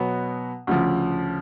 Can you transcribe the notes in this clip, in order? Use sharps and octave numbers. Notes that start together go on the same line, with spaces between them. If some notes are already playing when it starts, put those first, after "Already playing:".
Already playing: B2 F#3 B3 F#4
D2 C#3 F3